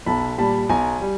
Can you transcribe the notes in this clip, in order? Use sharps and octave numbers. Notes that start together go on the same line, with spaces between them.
B1 A5 B5
A#2 G3 A5 B5
B1 G#5 A#5
G3